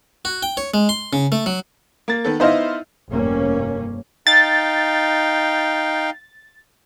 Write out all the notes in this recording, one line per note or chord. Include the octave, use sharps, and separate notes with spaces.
F#4
G5
C#5
G#3
C6
C#3
A3
F#3
A#3 A6
D#3 B3 A4
B3 D#4 E4 C5 D#5 F5
F1 G2 A#3 C#4
D#4 F5 G5 A6